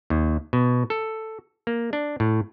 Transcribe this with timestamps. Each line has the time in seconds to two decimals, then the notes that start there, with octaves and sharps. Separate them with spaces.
0.10 D#2
0.53 B2
0.90 A4
1.67 A#3
1.93 D4
2.20 A2